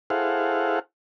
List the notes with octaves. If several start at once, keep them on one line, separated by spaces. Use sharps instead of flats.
E4 G#4 A4 C5 F5 F#5